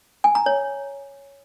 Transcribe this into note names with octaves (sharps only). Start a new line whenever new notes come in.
G#5
A#5
C#5